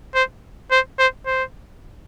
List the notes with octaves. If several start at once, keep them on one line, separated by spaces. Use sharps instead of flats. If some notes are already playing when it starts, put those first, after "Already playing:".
C5
C5
C5
C5